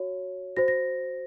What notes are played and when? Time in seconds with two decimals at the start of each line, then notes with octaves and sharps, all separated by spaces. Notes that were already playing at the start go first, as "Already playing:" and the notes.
Already playing: F#4 C#5
0.57 F#4 C5 A#6
0.68 A#6